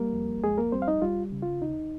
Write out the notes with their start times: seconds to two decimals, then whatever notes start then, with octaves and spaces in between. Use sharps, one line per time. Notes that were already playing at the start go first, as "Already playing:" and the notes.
Already playing: G3 A#3 A#4
0.13 F2
0.43 F2 G#3 G#4
0.58 A#3 A#4
0.72 G3 C4 C5
0.82 F5
0.88 D#4 D#5
1.02 G3 F4
1.32 C#3
1.42 F4
1.62 D#2 D#4